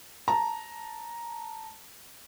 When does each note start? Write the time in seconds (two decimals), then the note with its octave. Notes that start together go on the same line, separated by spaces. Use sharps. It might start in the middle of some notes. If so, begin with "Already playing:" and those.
0.28 A5 A#5